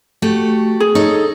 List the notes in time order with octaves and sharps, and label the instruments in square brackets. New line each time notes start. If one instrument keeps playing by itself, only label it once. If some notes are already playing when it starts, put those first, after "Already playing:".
[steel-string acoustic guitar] A3 F#4 G4
[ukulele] G#4
[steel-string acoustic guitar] D#4 A4 C#5